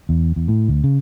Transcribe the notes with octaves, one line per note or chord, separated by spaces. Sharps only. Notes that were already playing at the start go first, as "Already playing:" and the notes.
E2
E2
A2
D2
C#3